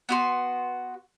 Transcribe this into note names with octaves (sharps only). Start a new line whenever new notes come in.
B3 F#4 C6